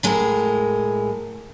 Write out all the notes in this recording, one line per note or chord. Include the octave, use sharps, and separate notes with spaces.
A2 G#3 A#4